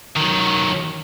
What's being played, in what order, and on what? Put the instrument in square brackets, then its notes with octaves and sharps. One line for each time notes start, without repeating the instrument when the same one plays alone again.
[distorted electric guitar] D#3 F#3